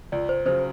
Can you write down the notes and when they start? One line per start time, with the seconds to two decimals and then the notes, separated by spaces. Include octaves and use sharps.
0.12 C#2 D5
0.29 C5
0.46 C#3 F#3 C5